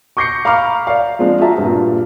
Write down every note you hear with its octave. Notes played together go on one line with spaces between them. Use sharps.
C#6 D6 G6 A#6 C7 C#7
F5 A#5 B5 C#6 D6 F6
D5 F5
F3 G#3 C4 D4
F4 F#4 G#4 E5 A5 A#5
G2 A#2